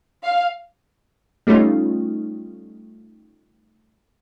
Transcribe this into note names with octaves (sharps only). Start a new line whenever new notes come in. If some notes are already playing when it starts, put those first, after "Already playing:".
F5
G3 A3 C#4 D#4 F4